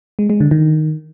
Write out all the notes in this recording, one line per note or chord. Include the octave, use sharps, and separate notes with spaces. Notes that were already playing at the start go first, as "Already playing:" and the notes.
G#3
G#3
D3
D#3